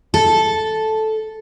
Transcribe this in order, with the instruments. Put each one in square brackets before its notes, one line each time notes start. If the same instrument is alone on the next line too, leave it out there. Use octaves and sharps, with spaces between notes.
[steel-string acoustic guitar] A4